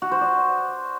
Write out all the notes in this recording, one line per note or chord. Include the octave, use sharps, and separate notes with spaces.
F#4
C5
D5